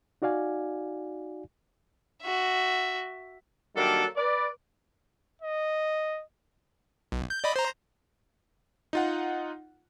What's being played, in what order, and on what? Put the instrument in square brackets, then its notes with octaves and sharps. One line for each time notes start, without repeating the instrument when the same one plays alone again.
[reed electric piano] D#4 F#4 D5 F5 G#5
[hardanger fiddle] F#4 E5
[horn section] D#3 F#3 G3 A#3 D4 A4
B4 D5
[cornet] D#5
[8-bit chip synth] B1
G6
D5 D#5 B5
C5 A#5
[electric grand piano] D#4 F4 F#5